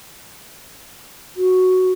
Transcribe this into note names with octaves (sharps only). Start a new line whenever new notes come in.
F#4